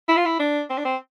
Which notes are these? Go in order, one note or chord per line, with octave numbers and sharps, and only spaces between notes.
E4
F4
E4
D4
C4
D4
C4